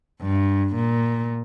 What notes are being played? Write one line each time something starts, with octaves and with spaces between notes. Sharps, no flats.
G2
A#2